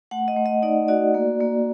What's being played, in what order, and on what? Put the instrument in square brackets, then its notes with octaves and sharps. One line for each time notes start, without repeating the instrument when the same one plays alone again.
[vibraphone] A3 F#5
D#5
A3
D#5
D#4 D5
F#4 D5
A#3
A#3